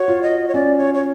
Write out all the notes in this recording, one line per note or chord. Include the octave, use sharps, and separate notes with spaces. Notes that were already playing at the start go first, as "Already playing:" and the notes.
Already playing: F#4 C#5
F4
D#5
C#5
C#4 D5
C#5
C#5